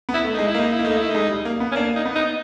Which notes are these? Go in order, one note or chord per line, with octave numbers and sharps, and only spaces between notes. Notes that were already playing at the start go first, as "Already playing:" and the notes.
B3
E4
A3
G#3 D#4
E4
A#3
D#4
E4
A#3
A3 D#4
E4
A3
G#3 D#4
G3
A#3
B3
C#4
A#3 D4
D#4
B3
D#4